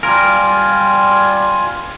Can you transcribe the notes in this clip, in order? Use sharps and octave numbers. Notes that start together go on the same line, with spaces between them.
G3 F4 A#4 G#5